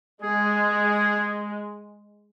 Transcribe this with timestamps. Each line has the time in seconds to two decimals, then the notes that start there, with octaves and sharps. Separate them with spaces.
0.22 G#3 G#4